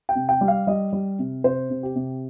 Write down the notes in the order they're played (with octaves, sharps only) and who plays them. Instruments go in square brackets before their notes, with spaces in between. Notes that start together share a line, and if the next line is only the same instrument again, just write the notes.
[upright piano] G5
C3
G5
G3
F5
G3 D#5
G3
C3
C3 C5
C3
G4
C3